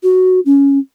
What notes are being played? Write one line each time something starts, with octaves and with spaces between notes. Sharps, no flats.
F#4
C#4